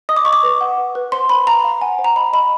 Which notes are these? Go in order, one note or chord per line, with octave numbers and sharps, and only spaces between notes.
D#5 D#6
D6
D#5 C#6
D6
B4
F#5
B4
B4
C5 C6
C5 B5
F5 A#5
F5
F#5 G#5
C5
A#5
D#5 B5
D#5 B5